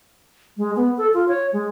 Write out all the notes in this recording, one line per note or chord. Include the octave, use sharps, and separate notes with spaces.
G#3
B3
A4
F4
C#5
G#3